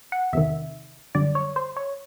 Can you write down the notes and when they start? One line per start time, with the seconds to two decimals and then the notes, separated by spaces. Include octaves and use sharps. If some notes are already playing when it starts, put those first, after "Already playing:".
0.12 F#5
0.33 E2 C3 D#3 E5
1.15 F#2 D3 G3 D5
1.35 C#5
1.56 C5
1.77 C#5